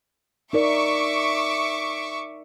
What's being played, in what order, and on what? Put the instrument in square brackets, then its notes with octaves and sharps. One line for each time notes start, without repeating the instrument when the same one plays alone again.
[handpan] D#4 A#4 D5 [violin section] E5 C#6 D6